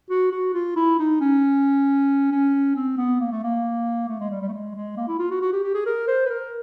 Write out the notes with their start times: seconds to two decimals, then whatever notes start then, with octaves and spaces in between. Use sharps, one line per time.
0.10 F#4
0.32 F#4
0.54 F4
0.76 E4
0.99 D#4
1.21 C#4
2.32 C#4
2.76 C4
2.97 B3
3.20 A#3
3.32 A3
3.43 A#3
4.08 A3
4.20 G#3
4.31 G3
4.42 G3
4.48 A3
4.53 G#3
4.75 G#3
4.97 A#3
5.08 E4
5.19 F4
5.31 F#4
5.41 F#4
5.53 G4
5.63 G4
5.75 G#4
5.86 A#4
6.08 C5
6.26 B4
6.30 A#4